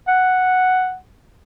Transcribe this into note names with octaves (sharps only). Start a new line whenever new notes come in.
F#5